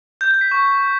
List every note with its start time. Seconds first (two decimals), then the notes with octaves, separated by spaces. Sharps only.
0.21 G6
0.31 G6
0.41 B6
0.51 C#6